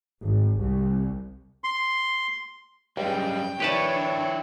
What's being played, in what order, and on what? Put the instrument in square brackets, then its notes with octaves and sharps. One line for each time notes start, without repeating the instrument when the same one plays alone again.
[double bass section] G#1
C2
[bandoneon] C6
[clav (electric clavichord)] C#2 [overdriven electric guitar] F#2 G3 [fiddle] G5
[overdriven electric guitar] D#3 E4 [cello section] D4 C#5 [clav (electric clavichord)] G4 B4 A5